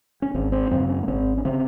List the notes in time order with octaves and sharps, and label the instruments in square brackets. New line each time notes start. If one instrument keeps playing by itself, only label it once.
[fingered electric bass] C#4
G#1 C4
C4
F#2 C#3 C4
C#4
A#3
G#1 C4
C#4
C#3 C4